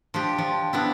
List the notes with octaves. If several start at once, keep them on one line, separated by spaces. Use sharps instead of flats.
F3 D4 G4
F3
B3 D4 E4